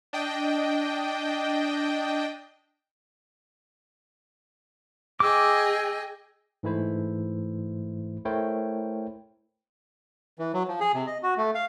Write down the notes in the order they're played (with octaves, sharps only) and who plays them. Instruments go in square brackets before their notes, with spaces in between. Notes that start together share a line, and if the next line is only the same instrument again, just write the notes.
[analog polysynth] D4 D#5 G5
[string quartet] G#4 D#5 G5 [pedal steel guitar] D6 E6
[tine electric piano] G#2 E3 A3 E4 C5
A3 E4 A#4 C5 C#5 G5
[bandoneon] E3
F#3
F3
G#4
C3
D#5
F#4
A3
F5